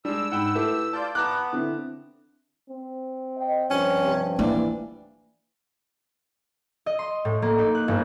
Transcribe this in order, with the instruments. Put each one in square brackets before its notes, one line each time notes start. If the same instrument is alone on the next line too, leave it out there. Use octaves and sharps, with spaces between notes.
[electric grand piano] G3 G#3 [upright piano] D4 [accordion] E6
[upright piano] G#2 [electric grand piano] F#5 G5 B5
[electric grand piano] A3 G4 [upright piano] E4 A4 B4
[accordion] F4 D5 G6 [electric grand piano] A5
[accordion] B3 [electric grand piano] A5 A#5 D6 [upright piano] F#6
[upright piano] D3 C4 E4
[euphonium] C4
[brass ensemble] D#5 G5
[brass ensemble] G2 F3 G5 [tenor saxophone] C#4
[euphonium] C3
[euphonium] E3 [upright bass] A#3 [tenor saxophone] D4
[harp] D#5
C6
A2
A#3
D#4
F#6
G1